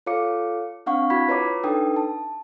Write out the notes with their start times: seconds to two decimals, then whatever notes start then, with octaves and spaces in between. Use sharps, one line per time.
0.06 F4 A4 C#5 F5 D6 C#7
0.86 C4 D4 F5 F#5 C#6
1.10 E4 F#4 B5 G#6 B6
1.28 F4 B4 C#5 D#5 A#5 D6
1.63 D4 D#4 A4 B4 G5 D#6
1.96 A5